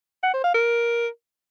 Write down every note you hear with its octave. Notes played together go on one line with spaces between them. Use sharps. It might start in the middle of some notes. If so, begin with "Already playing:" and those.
F#5
C5
F5
A#4